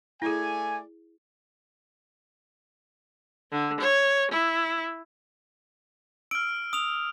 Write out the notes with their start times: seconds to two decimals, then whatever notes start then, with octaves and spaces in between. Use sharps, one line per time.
0.22 A3 E4 G#4 D5 G#5
3.52 D3
3.81 C#5
4.32 E4
6.31 E6 F6 D7
6.73 D#6 F7